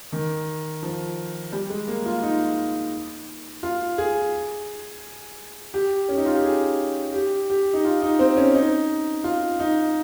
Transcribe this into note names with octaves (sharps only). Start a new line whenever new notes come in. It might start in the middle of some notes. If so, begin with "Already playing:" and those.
D#3
F3
G3
G#3
A#3
F4
D#4
F4
G#4
G4
C#4
D#4
F4
G4
G#4
G4
G4
D#4
F4
D#4
C4
C#4
D#4
F4
D#4